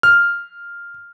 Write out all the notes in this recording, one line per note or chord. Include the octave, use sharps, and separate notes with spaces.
F6